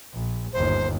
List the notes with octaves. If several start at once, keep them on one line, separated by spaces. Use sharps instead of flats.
A#1
G1 D#2 C5